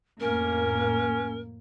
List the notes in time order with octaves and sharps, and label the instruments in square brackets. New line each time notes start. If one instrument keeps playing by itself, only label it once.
[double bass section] F2 A2 A#3 [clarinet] C#4 [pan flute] A#4